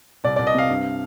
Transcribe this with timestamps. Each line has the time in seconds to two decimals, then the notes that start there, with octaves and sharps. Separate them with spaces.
0.24 C2 D5
0.36 C2 D5
0.47 D#5
0.54 C3 F5
0.70 G2